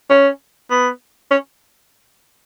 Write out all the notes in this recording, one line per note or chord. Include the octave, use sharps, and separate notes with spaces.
C#4
B3
C#4